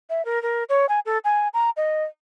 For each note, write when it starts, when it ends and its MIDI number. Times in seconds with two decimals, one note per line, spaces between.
0.10 0.25 76
0.25 0.42 70
0.43 0.64 70
0.69 0.86 73
0.89 1.00 80
1.06 1.18 69
1.24 1.48 80
1.54 1.70 82
1.77 2.04 75